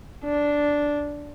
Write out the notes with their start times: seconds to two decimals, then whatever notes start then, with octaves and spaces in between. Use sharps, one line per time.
0.24 D4